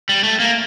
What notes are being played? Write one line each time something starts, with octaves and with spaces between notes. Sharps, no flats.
G3
A3
A#3